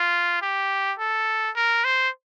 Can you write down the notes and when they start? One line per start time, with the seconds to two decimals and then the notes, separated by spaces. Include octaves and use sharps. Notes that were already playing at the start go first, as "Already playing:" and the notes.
Already playing: F4
0.42 G4
0.99 A4
1.56 A#4
1.85 C5